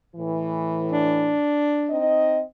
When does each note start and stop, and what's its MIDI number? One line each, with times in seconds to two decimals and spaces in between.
0.16 1.36 45
0.16 1.36 52
0.92 2.05 62
1.90 2.41 60
1.90 2.41 63
1.90 2.41 75